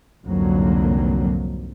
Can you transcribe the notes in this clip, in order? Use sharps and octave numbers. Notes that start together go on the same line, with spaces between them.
C2 F2 G#2 D3 F#3 A#3